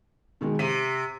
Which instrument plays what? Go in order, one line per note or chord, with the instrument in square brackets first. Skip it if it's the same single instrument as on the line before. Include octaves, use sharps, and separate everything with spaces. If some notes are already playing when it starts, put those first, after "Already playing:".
[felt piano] B2 D#3 G#3
[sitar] C3 [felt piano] B6 D#7